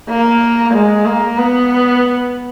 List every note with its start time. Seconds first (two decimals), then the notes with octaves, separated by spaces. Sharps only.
0.09 A#3
0.74 G#3
1.06 A#3
1.37 B3